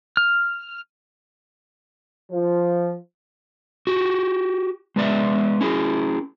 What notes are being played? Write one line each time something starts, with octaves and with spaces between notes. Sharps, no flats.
F6
F3
F#4 G4
G#3 B3 D5 E5
C#4 E4 G#4